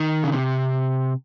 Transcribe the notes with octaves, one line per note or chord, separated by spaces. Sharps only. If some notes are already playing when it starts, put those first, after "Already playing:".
Already playing: D#3
C#3
C3